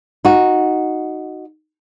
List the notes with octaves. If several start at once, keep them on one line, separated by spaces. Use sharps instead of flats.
D#4 F#4